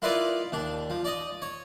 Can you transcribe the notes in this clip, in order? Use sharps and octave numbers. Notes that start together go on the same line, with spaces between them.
A#3 E4 F4 B4 D5 D#5
D#2 D4
F3
D5 D#5 D#6
C#5